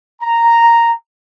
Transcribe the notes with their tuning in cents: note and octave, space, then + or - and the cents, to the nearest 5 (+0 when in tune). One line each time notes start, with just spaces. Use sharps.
A#5 -5